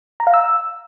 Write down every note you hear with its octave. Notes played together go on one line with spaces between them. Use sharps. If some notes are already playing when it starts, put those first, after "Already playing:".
A#5
F5
E6